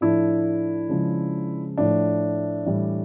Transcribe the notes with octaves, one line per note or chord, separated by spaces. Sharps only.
A2 F3 A3 D4 E4
C#3 F3 G#3
A2 F3 A3 D4
A2 E3 G3